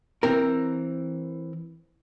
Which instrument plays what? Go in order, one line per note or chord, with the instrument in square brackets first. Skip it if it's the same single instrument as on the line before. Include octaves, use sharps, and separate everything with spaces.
[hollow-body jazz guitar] E3 C4 A#4